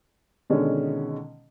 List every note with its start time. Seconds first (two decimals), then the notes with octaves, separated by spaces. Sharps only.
0.50 B2 D3 D#3 G#3 C#4